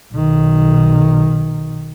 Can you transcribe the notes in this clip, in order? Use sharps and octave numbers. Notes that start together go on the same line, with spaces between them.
B1 D#3